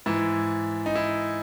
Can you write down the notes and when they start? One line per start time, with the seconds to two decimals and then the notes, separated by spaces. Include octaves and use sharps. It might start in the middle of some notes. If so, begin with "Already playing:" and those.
0.06 G#2 E3 E4
0.86 D#4
0.95 E4